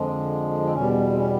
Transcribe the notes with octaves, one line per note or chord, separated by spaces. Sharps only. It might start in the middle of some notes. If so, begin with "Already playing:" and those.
Already playing: F2 D3 F3 G#3
C4
E2 B2 G3 C#4
C4
C#4